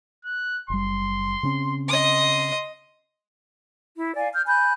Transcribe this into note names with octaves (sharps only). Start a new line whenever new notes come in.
F#6
F#1 G3 C6
C#3 C4 C#4
D#5 C6 D#6
E4
D5 F5 G#5
F6 G6
G#5 B5 F#6 G6